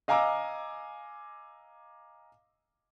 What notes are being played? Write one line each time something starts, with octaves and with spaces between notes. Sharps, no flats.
D#5 F5 G#5 A#5 D6 E6